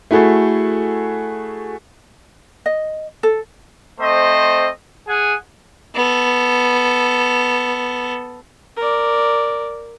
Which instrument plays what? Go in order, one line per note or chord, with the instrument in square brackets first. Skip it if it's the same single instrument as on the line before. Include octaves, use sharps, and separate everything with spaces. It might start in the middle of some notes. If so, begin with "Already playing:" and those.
[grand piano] A3 E4 F#4 G#4 A4
[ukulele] D#5
A4
[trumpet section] A3 C4 C5 D#5
G#4 F#5 G#5
[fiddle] B3 A4
[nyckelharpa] A#4 D5